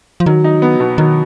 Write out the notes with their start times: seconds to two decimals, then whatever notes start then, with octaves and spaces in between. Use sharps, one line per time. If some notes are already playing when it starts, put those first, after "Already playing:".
0.20 F3
0.26 D#3 F#3
0.44 D#4
0.62 B3
0.80 B2
0.98 D#3 F#3